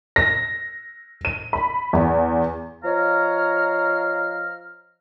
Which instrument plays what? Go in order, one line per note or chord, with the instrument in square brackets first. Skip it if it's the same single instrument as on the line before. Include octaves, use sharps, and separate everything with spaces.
[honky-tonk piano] A#6
D#7
B5
E2
[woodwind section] F3 C#5 D#5 F5 A#5 F6